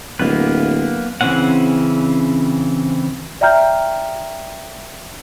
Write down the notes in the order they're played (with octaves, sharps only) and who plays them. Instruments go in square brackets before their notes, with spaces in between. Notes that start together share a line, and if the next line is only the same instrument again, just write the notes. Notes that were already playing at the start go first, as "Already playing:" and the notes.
[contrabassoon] D1 [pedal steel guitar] A#3 B3 B4
[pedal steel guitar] C#3 E3 C4 C#4 F#5
[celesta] D5 E5 G5 A#5 F6 G6